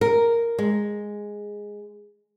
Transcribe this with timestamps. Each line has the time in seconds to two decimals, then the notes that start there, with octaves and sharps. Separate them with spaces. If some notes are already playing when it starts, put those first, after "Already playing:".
0.01 A#4
0.59 G#3